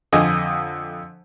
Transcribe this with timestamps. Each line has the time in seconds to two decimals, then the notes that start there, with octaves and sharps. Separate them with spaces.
0.12 F2 D3 D#5 G#5